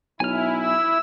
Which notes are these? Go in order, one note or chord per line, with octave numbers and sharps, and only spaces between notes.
B1 E4 G#5 F6
E6